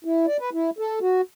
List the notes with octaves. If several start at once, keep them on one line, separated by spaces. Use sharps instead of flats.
E4
D5
B4
E4
A4
F#4